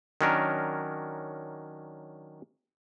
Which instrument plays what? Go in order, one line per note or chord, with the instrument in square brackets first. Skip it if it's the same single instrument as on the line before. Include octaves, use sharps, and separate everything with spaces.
[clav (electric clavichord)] D#3 F#3 C#4 D4 A#4